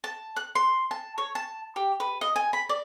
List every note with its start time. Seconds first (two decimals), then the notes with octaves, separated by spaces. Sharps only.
0.04 A5
0.36 F#6
0.55 C6
0.91 A5
1.18 C#5
1.35 A5
1.76 G4
2.00 B4
2.21 D#5
2.36 G#5
2.53 B5
2.69 D5